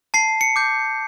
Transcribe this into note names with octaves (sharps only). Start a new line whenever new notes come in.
A5 C7
C#7
D6 G6